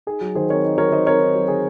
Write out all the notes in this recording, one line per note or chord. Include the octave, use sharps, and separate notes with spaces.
D#4 G#4
F#3
D#3 G#4 C5
C4 A#4 C#5
D#4
F#3 A#4 C#5
D#3 C5 D#5
C4 A#4 C#5
D#4
F#3
D#3 G#4